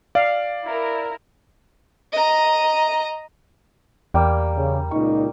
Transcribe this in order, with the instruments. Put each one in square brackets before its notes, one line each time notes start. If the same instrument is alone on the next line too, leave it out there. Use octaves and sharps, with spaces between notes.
[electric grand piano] D5 [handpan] F5
[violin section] E4 A#4
[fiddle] D#5 A#5
[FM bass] E2 [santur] G3 A#3 G5
[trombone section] C#3
[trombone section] C#2 A#2 D#4 [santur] C#6